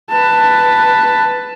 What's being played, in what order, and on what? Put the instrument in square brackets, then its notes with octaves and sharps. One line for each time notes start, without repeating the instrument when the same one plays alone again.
[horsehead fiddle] B4 A5